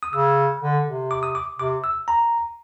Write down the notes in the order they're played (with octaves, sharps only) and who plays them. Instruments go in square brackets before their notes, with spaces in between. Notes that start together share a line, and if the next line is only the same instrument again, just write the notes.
[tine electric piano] D#6
[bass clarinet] C#3 [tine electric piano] E6
[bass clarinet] D3
C3
[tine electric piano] D6
D#6
D6
[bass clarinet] C3 [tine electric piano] D6
[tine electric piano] E6
A#5